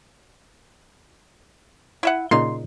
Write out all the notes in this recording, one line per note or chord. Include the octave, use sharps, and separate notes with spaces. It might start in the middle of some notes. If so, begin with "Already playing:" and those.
E4 E5 F#5
A#2 C#3 D#4 C6